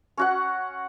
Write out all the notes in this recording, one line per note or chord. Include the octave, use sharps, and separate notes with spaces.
C#4 F#4 F#5